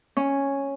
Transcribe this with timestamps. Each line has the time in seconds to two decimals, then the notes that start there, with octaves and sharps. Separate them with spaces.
0.17 C#4